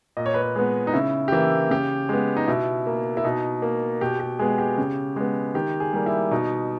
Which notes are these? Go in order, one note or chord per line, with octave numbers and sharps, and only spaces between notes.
A#2 D#5
C#5
B4
C#5
G#3 B3
D#4
C#3 E4
G4
E3 A#3 E4
C#3 G4
G#3 B3
D#4
B2 E4
A#3
E4
B2 D#4
A#3
B2 G4
G4
G#3 B3 G#4
G4
C#3
G#3 B3
D#3 G4
G#4
G3 A#3
E4
B2 D#4